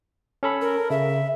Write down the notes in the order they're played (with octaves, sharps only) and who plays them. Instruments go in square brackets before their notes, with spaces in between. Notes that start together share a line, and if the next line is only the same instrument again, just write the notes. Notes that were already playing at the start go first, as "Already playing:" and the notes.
[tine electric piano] C#4 A4 B5
[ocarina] A#4
[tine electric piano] C#3 [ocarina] E5